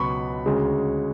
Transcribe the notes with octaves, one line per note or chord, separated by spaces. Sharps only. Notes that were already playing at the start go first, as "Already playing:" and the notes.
Already playing: C#2 B2 F#3 B5 C#6
D2 C#3 G#3